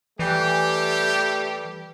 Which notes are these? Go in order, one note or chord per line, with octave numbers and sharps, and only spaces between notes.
E3 G3 A3 G4